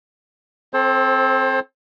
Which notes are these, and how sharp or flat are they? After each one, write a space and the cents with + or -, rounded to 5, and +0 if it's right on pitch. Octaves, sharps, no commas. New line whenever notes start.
C4 +0 A4 -15 C5 +30